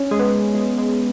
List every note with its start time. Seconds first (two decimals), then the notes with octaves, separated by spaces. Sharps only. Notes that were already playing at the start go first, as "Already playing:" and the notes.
Already playing: C#4
0.11 G#3
0.19 B3
0.55 G#3
0.78 G#3